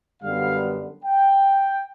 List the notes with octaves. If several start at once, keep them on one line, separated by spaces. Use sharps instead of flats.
F#2 D3 G3 B3 F5
G5